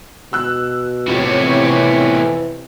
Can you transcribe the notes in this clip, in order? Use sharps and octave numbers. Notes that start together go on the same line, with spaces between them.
B2 E6 F#6
F2 A2 C3 B3 G4 C#5
E3